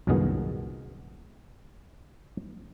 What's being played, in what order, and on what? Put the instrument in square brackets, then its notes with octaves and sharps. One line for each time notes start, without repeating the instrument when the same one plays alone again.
[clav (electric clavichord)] C2 F#2 A#2 D#3 B3 G#4